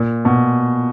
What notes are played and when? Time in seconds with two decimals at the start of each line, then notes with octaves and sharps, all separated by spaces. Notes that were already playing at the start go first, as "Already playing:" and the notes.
Already playing: A#2
0.25 B2